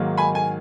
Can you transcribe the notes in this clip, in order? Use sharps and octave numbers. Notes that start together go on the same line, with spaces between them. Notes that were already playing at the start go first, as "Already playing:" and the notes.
Already playing: G#2 D#3 F#3 A#3
G#5 B5
G#5